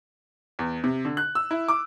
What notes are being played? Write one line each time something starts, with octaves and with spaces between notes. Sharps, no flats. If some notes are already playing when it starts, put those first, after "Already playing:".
E2
C3
D3
F#6
E6
E4
D6